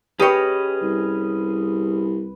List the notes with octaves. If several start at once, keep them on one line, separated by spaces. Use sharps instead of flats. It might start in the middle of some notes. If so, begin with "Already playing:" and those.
C#4 G4 G#4 B4 C#5 D#5
C2